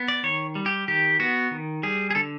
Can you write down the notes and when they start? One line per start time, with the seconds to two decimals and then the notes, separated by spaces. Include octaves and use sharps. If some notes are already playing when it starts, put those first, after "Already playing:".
Already playing: B3
0.08 D5
0.23 D#3 C#5
0.55 G3
0.66 G4
0.88 D#3 G4
1.20 B3 F#4
1.51 D#3
1.83 G3 G#4
2.11 G#4
2.15 D3 A4